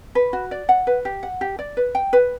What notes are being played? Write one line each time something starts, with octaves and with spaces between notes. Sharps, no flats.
B4
F#4
D5
F#5
B4
G4
F#5
G4
D5
B4
G5
B4